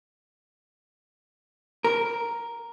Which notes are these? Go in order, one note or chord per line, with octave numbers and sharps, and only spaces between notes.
A#4